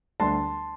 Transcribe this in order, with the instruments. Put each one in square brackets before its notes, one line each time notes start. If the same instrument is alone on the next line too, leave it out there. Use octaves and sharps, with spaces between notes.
[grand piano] D2 D3 G3 D4 A5 C6